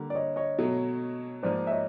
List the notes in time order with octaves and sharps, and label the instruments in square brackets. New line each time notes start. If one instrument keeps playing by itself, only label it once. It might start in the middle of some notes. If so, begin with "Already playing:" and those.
Already playing: [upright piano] D3 G3 A#3
[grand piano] D5
C#5 D#5
C#5 D#5
[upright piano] B2 F#3 A3
[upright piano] G#2 F3 A#3 [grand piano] C5 D5
[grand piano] E5
C#5 D#5